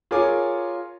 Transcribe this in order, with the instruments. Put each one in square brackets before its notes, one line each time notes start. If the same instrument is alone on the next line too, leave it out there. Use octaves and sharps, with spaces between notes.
[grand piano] F4 G#4 A#4 C#5 G#5 D6